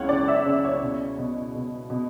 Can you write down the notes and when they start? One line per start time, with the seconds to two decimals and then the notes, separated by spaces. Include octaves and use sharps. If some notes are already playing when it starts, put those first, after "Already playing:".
Already playing: C#2 E3 C#5 F#5
0.09 C#3 D5
0.28 E5
0.46 C#3 D5
0.64 C#5
0.82 B2
1.18 B2
1.55 B2
1.90 B2